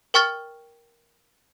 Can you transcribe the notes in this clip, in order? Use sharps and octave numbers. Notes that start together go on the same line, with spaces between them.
A#4 G5 C#6 F6 A6